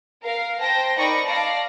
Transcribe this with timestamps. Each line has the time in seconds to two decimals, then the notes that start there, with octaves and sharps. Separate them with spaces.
0.23 A#4 F5
0.61 C5 G5 A5 A#6
0.97 D#4 A#4 D5 B5 C#6 A#6
1.26 D5 F5 A5 A#6